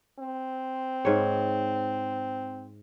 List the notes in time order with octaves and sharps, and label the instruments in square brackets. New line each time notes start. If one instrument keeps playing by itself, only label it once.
[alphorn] C4
[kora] G#2 C#5